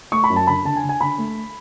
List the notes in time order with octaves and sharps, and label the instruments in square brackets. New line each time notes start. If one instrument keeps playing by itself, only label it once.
[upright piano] A3 C#6
B5
F#2
A5
D3 B5
D3 A5
G#5
D3
G#5
D3 B5
A3